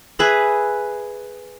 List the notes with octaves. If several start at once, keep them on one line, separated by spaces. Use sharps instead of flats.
G#4 B4 E5 B5